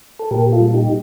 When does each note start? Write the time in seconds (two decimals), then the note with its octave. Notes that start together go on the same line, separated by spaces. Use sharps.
0.19 A4
0.31 A#2 G4 A#4
0.53 F4 A4
0.60 G3
0.74 D#4 G4